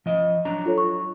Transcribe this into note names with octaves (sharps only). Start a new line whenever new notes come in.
F3 D#5
F#3 D4 A#5
F4 A4 C#5
C#6